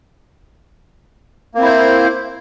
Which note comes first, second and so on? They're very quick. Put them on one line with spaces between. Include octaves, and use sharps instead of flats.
A#3 C4 E4 C5